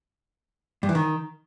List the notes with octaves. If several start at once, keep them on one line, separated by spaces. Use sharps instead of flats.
G2
E3
D#3